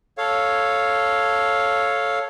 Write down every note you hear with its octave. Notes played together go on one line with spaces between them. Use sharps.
A4 C#5 F5